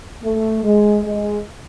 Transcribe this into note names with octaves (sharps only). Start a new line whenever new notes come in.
A3
G#3
G#3